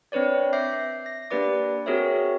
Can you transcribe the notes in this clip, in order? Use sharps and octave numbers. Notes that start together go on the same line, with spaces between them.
C4 D4 B4 C#5 D5
E5 D6 G6 A#6 C7
A#6
A#3 D4 G4 B4 D5 D6
C4 F#4 G#4 A#4 C#5 E5